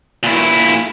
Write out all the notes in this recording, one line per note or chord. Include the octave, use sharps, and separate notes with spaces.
A#2 E4